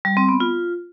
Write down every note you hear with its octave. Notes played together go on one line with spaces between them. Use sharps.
G3
C4
B3
F4